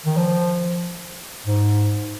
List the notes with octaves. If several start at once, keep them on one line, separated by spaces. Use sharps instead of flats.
D#3
F3
G#2